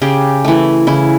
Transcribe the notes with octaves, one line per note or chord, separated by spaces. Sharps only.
C#3 G4
E3 A3
C#3 E4